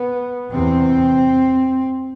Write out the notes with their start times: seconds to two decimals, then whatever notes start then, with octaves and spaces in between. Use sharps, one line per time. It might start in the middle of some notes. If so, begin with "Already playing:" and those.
Already playing: B3
0.53 E2 C3 C4